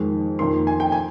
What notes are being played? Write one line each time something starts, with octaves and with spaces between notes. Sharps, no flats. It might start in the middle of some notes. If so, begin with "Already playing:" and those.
Already playing: F2 D#3 G#3
F2 D#3 A#3 C6
G#5
G5
G#5